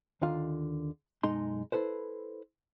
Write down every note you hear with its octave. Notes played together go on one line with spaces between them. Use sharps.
D#2 D3 D#3 F4 F5
B1 F#2 G#3 D#4 C6
E4 A4 B4 C5